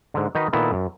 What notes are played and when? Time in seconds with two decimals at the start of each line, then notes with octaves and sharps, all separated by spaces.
0.14 G#2 D3
0.35 D#3 D#4 F#4 B4
0.53 A#2 D#3 B3 E4 A4
0.73 F#2